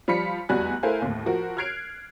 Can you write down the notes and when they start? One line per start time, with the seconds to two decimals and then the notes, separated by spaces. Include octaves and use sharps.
0.08 F3 G3 F5 B5 B6 C#7
0.49 F1 E2 G3 F#4 G#5 F#6
0.83 A3 E4 A#4 C5 F5 G#5
1.02 D#2 A2
1.26 F3 F#4 A#4
1.57 F6 F#6 G#6 C7 D7 F7